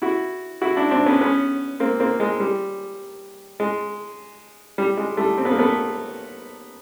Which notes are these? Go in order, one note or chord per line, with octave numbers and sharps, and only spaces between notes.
E4 F#4
E4 F#4
D4 E4
C4 D4
B3 C#4
B3 C#4
A#3 C4
A#3 C4
G#3
G3
G#3
G3
G#3
G3 A3
C4
B3
A#3
A3 B3